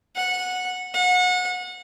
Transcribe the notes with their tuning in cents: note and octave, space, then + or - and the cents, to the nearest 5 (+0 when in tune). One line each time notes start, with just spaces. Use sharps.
F#5 -15
F#5 -30